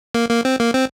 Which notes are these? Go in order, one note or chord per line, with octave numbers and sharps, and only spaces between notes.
A#3
A#3
C4
A#3
C4